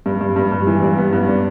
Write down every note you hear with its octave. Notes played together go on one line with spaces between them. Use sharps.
G2
G2
G2
G2
E3
G2
B3
G2
D4